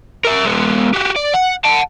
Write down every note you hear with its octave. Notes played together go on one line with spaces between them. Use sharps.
A#4 E5
G#3 B3
F#4 G4
D5
F#5
F#5 A5